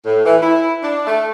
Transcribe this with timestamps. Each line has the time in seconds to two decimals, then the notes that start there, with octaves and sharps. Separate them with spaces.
0.05 A2
0.25 E3
0.41 E4
0.82 D4
1.06 A3